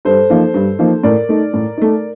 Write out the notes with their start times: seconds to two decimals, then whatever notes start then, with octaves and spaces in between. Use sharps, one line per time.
0.05 G2 A4 C5
0.30 F3 A#3 D#4
0.54 G2
0.79 F3 A#3 D#4
1.03 A2 A#4 D5
1.29 A3 D#4
1.54 A2
1.78 A3 D#4